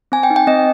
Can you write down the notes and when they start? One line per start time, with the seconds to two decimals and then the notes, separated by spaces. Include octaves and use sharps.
0.12 C4 G#5
0.23 G5
0.30 D#4
0.36 G5
0.47 C4 D#5